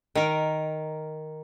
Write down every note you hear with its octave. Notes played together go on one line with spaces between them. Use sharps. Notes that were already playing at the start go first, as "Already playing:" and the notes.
D#3 A#4